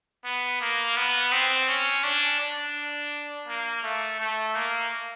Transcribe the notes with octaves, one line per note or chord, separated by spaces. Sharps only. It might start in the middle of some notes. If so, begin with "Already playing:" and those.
B3
A#3
B3
C4
C#4
D4
D4
A#3
A3
A3
A#3